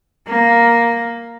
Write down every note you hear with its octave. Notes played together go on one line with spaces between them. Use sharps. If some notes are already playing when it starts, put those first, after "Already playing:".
A#3